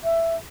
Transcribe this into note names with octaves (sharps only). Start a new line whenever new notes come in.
E5